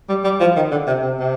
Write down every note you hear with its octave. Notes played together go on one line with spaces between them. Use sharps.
G3
G3
F3
D#3
D3
C3
C3
C3